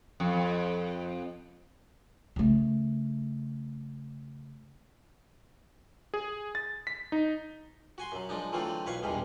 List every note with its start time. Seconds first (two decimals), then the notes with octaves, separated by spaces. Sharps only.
0.20 F2
2.36 C#3 A3
6.14 G#4
6.55 A6
6.87 B6
7.12 D#4
7.98 F#4 G#5 C6
8.12 F#2 F#3
8.29 F3 G#3 D4 D#4
8.52 D3 E3 F#3 A3 C4 F4
8.86 B1 B4 C#5 F5 C#6
9.02 A#1 E2 B2 G3 G#3